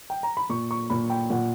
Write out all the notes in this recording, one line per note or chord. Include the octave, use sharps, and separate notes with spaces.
G5
A#5
B5
A#2 C#6
C#6
A#2 B5
G5
A#2 F#5